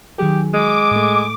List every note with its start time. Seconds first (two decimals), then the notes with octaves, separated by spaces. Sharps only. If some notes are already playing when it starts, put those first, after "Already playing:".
0.18 D#3 F#3 G4 G#4
0.53 G#3 D6 D7
0.91 A2 A3